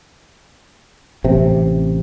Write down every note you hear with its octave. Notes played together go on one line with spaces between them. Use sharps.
A1 C3